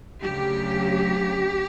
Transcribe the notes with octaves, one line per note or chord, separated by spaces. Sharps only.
D2 C#3 F#3 G4